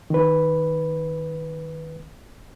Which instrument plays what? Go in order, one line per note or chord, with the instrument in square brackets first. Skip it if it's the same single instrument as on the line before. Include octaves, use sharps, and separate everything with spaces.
[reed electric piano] D#3 B4